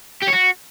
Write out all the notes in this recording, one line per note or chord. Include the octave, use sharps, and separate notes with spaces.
G4
C#5
F#4